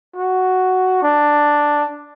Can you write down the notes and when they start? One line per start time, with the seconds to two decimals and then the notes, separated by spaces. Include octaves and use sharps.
0.16 F#4
1.03 D4